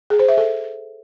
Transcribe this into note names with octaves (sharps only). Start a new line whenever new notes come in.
G#4
C5
E5
A4